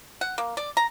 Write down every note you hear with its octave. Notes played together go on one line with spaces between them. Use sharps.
F#5
A#3
D5
A#5